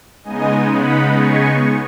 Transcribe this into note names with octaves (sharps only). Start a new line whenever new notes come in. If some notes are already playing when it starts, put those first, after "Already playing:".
C#3 G#3 B3 D#4 D#5 G#5
F#5 B5
G#5 C#6